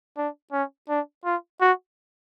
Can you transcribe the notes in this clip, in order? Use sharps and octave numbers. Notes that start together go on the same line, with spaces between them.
D4
C#4
D4
F4
F#4